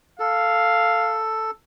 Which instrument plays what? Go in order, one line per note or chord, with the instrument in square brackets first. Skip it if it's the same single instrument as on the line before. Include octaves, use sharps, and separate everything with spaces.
[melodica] A4 [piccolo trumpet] F5